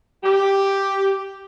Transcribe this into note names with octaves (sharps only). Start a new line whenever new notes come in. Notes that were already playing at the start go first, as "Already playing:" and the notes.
G4